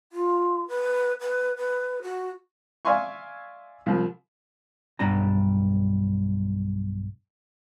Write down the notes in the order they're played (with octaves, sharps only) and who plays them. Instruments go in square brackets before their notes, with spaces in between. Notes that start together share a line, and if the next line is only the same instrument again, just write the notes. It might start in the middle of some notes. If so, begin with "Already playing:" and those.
[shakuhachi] F4
B4
B4
B4
F#4
[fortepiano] D5 E5 F5 G#5 C6 C#6
C2 F3
[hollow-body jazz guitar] B1 G2 G3 D4 G4 A#5